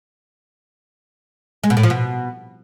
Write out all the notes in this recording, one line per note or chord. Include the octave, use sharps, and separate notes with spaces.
G#3
B2
A2
F3
B2